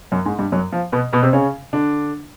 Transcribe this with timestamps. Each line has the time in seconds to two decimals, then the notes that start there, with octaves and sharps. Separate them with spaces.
0.12 F#2 F#3
0.25 G#2 G#3
0.39 G2 G3
0.52 F#2 F#3
0.72 F3
0.92 B2 B3
1.13 B2 B3
1.23 C3 C4
1.33 C#3 C#4
1.73 D3 D4